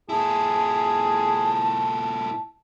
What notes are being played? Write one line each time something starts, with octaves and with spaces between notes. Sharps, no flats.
A#2 E4 G#4 A5